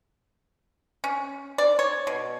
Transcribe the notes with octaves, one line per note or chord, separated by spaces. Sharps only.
C#4
D5
C#5
B2